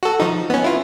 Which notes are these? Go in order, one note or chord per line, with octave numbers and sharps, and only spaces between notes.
F#4 A4
F3 D#4
B3 C#4
E4 F4